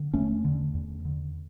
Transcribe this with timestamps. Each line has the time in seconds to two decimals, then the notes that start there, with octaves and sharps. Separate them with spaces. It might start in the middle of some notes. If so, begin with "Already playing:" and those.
Already playing: D3
0.14 E2 A3 C#4
0.45 D3
0.74 E2
1.05 D3